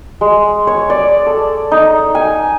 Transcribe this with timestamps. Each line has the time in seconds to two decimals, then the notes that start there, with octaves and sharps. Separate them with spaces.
0.21 G#3
0.67 C#5
0.90 D5
1.26 A4
1.71 D#4
2.15 G#5